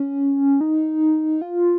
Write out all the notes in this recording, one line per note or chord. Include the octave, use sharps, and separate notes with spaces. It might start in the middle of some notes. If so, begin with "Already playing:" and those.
Already playing: C#4
D#4
F4